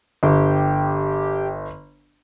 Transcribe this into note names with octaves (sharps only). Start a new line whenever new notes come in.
G1 G4